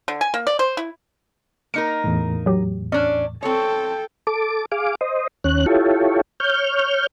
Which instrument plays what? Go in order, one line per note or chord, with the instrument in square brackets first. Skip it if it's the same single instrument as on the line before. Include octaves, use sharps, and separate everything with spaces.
[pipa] D3
G#5
A#3
D5
C5
E4
[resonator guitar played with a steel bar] A#3 D#4 A#4 [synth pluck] C#7
[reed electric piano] E2 A2
[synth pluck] F#3 G4
[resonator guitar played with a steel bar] C#4 D4 [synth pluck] D5
[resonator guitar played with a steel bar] C4 C#5 [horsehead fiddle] A4 G5
[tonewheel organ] A4 D6
G#4 F5 D6
C5 D#5
D#2 C#4 F#6
E4 F4 G4 A4 C#5
C#5 F6 G6